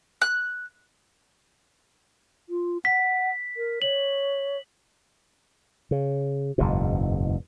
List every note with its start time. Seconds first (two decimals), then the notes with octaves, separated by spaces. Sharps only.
0.22 F#6
2.49 F4
2.85 F#5 B6
3.57 A#4
3.82 C#5 F#7
5.91 C#3
6.58 F#1 E2 G#2 B2